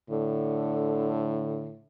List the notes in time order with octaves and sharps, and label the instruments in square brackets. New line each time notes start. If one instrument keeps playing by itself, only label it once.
[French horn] A2 [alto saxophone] D3